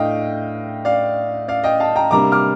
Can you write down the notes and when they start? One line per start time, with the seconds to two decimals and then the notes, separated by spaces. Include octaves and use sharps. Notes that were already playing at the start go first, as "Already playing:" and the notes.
Already playing: A2 A3 D4 D#5 F5 G5
0.85 D5 F5
1.48 D5 F5
1.64 D#5 G5
1.80 F5 A5
1.96 G5 A#5
2.11 C3 G3 A#3 D4 A#5 D6
2.32 D6 F6